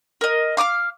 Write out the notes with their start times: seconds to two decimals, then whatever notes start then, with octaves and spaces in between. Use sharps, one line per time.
0.21 A#4 D#5
0.57 F5 D6 D#6 F6